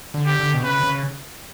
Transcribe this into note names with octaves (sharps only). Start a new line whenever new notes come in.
D3
G4
D3
B2
C#3 B4
C#3